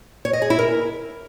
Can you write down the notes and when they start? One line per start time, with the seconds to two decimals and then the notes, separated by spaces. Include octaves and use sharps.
0.25 C#5
0.33 D#5
0.42 G#4
0.50 E4
0.59 A#4